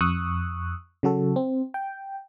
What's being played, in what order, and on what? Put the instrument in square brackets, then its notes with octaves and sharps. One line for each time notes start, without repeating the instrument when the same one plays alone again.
[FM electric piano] F2 C#6 D#6 E6 F#6
C#3 F#3 F#4 A4
C4
G5